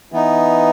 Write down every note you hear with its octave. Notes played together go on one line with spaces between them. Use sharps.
E3 B3 D#4